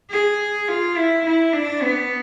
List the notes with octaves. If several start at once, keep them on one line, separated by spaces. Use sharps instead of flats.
G#4
F4
E4
E4
D4
B3